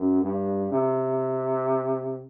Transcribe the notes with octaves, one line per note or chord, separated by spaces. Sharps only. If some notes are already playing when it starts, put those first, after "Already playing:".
Already playing: F#2
G2
C3